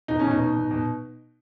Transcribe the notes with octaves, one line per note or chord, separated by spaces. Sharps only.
B2 D#4
C#4
B2
D#4
B2
B2
B2